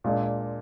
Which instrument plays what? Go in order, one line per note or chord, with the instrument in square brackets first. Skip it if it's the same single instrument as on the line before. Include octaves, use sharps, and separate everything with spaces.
[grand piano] A#2 G#3 D4